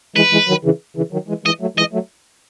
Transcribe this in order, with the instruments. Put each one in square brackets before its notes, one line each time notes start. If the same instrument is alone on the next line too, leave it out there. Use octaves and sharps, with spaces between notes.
[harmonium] E3 G#3 [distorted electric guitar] B4
[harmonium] E3 G#3
D#3 F#3
C#3 E3
C#3 E3
D#3 F#3
E3 G#3
[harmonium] E3 G#3 [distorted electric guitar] D#5
[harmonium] F#3 A3
[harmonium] E3 G#3 [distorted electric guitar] D#5
[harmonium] F#3 A3